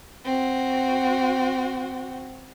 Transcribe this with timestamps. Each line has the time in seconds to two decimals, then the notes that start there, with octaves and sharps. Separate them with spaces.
0.25 C4 F#4